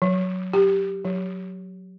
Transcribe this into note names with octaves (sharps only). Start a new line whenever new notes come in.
F#3
G4
F#3